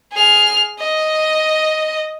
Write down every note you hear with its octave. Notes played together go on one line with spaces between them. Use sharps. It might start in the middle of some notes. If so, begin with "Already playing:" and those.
G#4 F6
D#5